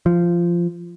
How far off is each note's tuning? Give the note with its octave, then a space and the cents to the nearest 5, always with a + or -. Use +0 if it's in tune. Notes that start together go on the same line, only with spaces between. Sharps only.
F3 -15